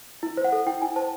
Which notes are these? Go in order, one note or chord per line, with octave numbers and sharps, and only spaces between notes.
E4
C5
F#5
A4
E4 G5
E4 G#5
C5 A5